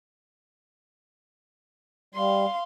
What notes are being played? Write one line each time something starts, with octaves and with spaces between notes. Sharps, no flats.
G3 F5 C6